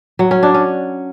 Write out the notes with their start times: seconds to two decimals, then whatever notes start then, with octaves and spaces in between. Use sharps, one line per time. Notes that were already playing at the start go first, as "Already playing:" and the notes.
0.19 F#3
0.31 C#4
0.43 D4
0.54 C#4